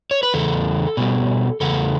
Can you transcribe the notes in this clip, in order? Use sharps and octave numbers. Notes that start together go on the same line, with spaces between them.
C#5
B4
E2 C#3 A4
B2 G3
E2 C#3 A4